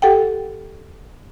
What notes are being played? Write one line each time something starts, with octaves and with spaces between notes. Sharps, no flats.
G4 A4 F#5 G5